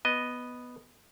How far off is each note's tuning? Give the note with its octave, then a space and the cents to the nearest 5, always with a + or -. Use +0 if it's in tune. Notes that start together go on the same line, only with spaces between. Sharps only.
B3 +0 D#5 +0